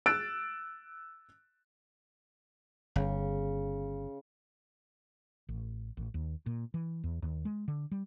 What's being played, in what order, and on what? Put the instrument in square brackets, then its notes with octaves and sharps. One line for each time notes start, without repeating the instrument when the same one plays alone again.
[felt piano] E6 F#6 A6 D7
[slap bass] G1 [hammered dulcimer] C#3
[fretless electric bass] A1
A1
D#2
A#2
E3
E2
D#2
G#3
D3
G3